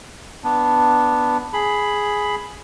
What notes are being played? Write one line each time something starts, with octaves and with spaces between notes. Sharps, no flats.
B3 D4
G#4 B5